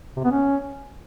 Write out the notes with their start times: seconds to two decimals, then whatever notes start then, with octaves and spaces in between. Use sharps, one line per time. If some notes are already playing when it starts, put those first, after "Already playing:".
0.16 C3
0.24 B3
0.32 C#4